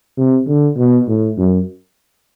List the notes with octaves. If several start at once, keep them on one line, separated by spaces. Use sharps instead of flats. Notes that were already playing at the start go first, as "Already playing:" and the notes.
C3
D3
B2
A2
F#2